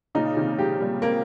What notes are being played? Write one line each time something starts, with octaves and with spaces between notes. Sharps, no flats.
A#2 C#3 D#4
C3 D#3
F3 G#3 G4
G3 A#3
G#3 A#3 C4